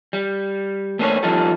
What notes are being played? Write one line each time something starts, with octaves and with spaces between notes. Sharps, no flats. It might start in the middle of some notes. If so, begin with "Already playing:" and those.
G3
A3 A#3 C#4 D4 C5 C#5
F3 G3 C#4 D#4 F4 A4